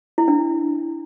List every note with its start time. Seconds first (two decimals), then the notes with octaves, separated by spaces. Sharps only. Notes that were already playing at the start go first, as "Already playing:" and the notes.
0.18 E4
0.28 D4